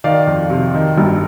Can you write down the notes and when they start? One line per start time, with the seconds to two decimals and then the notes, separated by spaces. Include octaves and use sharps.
0.04 D#3 D5 F5
0.27 F2
0.50 C3
0.74 D#3
0.98 G1